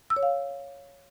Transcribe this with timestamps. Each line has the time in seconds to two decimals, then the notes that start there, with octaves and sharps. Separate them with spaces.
0.10 E6
0.16 C#5
0.23 F5